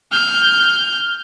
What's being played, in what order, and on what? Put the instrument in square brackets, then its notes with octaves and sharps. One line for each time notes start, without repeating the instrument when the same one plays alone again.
[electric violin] F6 G6